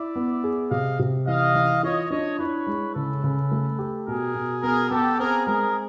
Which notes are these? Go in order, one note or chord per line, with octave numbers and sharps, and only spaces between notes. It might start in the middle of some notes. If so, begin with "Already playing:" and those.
Already playing: E4 D5 E5
B3
G#4
C3 D#5 F5
C3
E3 D#5 F5
E3
F4 C#5 D#5
D4 C#5 D#5
E4 B4 C#5
G#3
C#3 A4 B4
C#3
A3
G4
B2 G#4 A#4
B2
B3 G#4 A#4
B3 G4 A4
C4 G#4 A#4
G#3 G#4 A#4